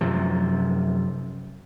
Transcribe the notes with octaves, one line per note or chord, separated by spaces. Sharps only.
F#2 C3 F3